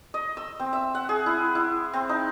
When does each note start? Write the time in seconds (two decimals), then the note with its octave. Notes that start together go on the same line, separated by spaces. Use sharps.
0.14 D#5
0.37 E6
0.60 C4
0.73 E5
0.95 F#5
1.09 G#4
1.26 E4
1.55 E4
1.93 C4
2.09 D#4